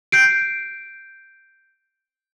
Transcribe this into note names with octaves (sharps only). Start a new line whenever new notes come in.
G6 C7 D7